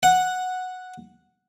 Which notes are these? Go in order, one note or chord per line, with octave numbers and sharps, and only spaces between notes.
F#5